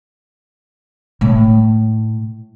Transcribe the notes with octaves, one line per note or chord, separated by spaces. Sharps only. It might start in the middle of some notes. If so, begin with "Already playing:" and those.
A2 A3